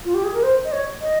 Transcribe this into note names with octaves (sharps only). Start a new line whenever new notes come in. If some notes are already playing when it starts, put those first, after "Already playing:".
F4
G4
G#4
A#4
C5
D#5
C#5
D#5